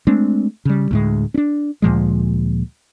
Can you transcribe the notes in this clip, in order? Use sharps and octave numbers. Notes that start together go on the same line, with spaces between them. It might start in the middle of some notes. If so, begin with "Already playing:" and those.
G#3 A3 C4 D4
C#3 G3
D2 A2 G#3
C#4 D4
D2 A#2 F3 G#3